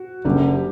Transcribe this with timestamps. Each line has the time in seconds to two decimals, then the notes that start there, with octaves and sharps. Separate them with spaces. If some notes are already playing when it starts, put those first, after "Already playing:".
Already playing: F#4
0.24 F#1 F#2 D3 G3 G4